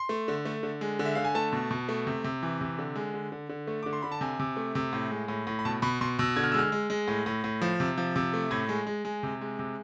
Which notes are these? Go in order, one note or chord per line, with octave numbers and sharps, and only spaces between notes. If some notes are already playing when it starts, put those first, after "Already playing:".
Already playing: C6
A3
D3
A3
D3
G#3
D3
E5
D3 F5
G#5
A3 A5
B2
B2
A3
C3
C3
E3
C3
D3
G#3
D3
D3
D3
A3
D3 D6
C6
D3 B5
A5
C3 G#5
C3
A3
C3
A2
G#3
A2
A2
B5
B2 A5
B2 B5
B2 C6
B2 E6
D3 G#6
F6
G#3 E6
F6
G#3
G#3
A2
A2
A2
F3
C3
F3
C3
A3
A2 G#6
G#3
G#3
G#3
C3
G#3
C3